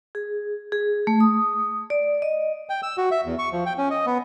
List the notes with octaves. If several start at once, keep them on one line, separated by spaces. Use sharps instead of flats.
G#4
G#4
A3
D#6
D5
D#5
G5
E6
F#4
E5
E2
C#6
F3
G5
C#4
D#5
B3